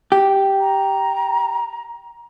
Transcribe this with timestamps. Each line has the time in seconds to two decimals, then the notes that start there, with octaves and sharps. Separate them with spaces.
0.12 G4
0.60 A#5